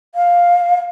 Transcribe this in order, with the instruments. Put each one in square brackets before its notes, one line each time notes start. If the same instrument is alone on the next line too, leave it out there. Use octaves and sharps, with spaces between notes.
[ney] F5